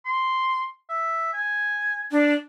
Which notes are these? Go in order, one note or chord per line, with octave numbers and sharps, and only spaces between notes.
C6
E5
G#5
D4